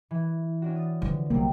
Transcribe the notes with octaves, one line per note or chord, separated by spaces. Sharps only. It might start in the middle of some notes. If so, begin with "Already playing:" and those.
E3
C#4 D4 F#4
D#6 A6
D3 E3 F3
A#1 C3 F#3 G3 A#3